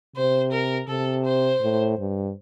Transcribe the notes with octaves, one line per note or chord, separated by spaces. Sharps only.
C3 C5
A#4
C3 A4
C5
A2
G2